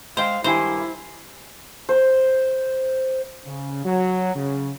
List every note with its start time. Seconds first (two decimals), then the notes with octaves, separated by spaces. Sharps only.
0.17 G#3 C5 F5 G5
0.44 G2 D#3 E4 G4 C5 E5 G#5
1.89 C5
3.46 C#3
3.85 F#3
4.35 C#3